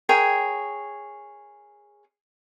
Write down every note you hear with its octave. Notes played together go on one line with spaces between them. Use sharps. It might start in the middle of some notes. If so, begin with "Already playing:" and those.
G#4 A#4 C#5 G5